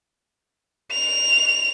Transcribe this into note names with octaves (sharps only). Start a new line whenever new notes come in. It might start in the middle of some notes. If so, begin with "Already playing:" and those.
F7